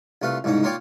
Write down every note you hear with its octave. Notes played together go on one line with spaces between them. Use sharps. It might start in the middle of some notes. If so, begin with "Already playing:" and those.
C2 A3 F4 B4
C2 G#2 C#3 D#4
A#3 F4 C#5 D5 G5